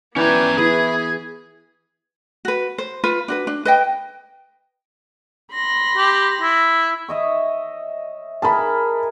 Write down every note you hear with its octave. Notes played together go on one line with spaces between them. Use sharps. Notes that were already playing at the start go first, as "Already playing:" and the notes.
E3 B3 C#4 B4 D5 G5 G#5 A#5
E3 E4 G#4 B4
F#4 B4
C5
F4 B4
D4 F#4 B4
D4
B4 D#5 G5
B5 C6 A#6
G4
E4
C#5 D#5 E5
G#4 A#4 A5 B5